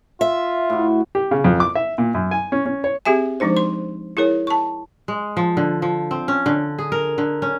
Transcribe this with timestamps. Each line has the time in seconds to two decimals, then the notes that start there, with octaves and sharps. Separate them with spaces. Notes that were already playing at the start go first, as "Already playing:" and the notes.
0.21 F4 E5
0.70 A2 F#4
1.15 G4
1.31 C#3
1.44 F2
1.60 D6
1.75 E5
1.98 A#2
2.14 F#2
2.31 G#5
2.52 C#4
2.66 C#4
2.84 C#5
3.05 C4 G4 G#4 E5 G#5
3.40 F3 G#3 D4 D#4 C5
3.57 C6
4.17 E4 G#4 A#4 C#5
4.47 A5 C#6
5.08 G#3
5.37 F3
5.57 D3
5.82 F3
6.11 C4
6.28 C#4
6.46 D3
6.79 G#4
6.92 A#4
7.18 D3
7.42 C#4